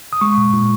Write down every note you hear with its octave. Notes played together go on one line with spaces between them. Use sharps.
D#6
G#3 C#6
A#2
A#2